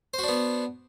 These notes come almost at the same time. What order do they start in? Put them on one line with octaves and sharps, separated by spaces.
C5 F#4 D4 B3